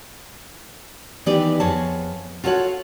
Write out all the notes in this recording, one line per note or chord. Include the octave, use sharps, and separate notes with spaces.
D#3 E3 B3 G4 B4 D5
F2 B3 G#4 C#5 A5
F4 F#4 A4 C5 C#5 F#5